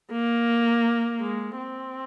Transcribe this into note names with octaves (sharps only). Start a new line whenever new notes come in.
A#3
G#3
C4